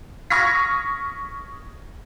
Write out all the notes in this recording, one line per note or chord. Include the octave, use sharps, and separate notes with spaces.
C#6 D#6 F6 G#6 A#6 B6